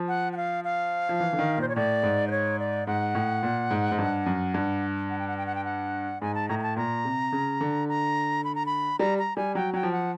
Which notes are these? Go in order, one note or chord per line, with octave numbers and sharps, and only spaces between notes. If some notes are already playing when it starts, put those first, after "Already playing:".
Already playing: F3
F#5
F#5
F5
F5
F3
E3
D3
D#3
A#2 C5
C#5
A2 D5
G#2
C5
C#5
D5
G#2 F#5
A2
A#2
G#2
G#2
G2
F#2
G2
F#5
G5
F#5
G5
F#5
G5
F#5
G#2 G#5
A5
A2 A#5
A#5
A5
A#2 A#5
C3
C#3
D3
A#5
B5
A#5
B5
G3 A#5
A#5
G3 G#5
F#3 G5
F#3 G5
F3
F#5